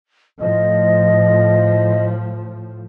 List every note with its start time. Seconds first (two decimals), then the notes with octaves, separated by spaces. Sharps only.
0.40 A2 F3 D#5